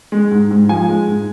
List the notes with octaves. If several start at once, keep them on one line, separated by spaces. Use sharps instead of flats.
G#3
G#2
G#2
F3 G#5
G#3
G#2